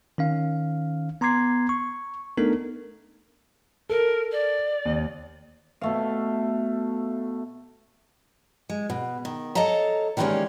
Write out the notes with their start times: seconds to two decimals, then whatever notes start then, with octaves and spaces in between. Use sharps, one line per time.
0.18 D#3 C#4 F5
1.21 B3 A#5 C6 D6 G#6 C7
1.69 C#6
2.38 A3 B3 D4 D#4 A4 A#4
3.89 A4 A#4
4.31 D5
4.85 D#2
5.81 B2 A3 F5
8.70 G#3
8.90 B2
9.25 D#3
9.55 A4 C#5 D#5 F5 A5 A#5
10.17 D#3 E3 G3 G#3 A#3 C#4